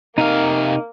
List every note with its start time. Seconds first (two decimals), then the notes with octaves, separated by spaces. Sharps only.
0.18 C3 A#3 D#4 F5